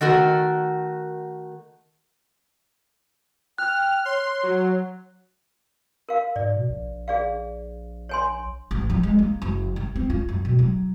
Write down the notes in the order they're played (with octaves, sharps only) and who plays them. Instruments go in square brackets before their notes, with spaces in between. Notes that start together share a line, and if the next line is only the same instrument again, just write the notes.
[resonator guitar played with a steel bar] D#3 A3 F#4 A#4
[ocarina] G5 [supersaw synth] F6 [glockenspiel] F#6
[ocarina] C#5 [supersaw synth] C6
[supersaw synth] F#3
[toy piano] A#4 F5
[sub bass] G#2 [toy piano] D5
[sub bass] B2
A#1
[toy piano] G#4 D5 F5
C#5 G#5 C6
[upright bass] A1
F3
G#3
A#3
F#1
G2
C4
F4
F#2
B2
F#3